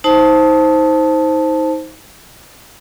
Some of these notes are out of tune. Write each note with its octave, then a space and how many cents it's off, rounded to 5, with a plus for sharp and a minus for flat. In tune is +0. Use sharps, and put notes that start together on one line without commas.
D#4 +25 C5 +0 A5 +0